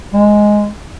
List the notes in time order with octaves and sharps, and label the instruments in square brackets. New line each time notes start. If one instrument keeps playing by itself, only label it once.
[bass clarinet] G#3